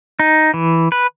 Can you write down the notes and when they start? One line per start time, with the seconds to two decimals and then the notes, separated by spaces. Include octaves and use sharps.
0.19 D#4
0.54 E3
0.92 B4